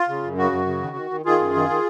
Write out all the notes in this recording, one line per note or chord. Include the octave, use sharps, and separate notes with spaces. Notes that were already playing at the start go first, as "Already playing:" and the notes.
Already playing: F4
C#3
F#2
C#3 F#4
F#2
C#3
D#3
D#3
D#3
D#3 F4 G#4
F#2
D#3
D#3